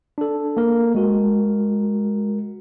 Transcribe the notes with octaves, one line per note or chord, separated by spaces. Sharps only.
D4 A4
A#3 A#4
G#3 F#4 A#4